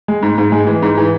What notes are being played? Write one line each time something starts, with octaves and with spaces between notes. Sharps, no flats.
G#3
G#2
G#2
G#3
E3
G#2
E3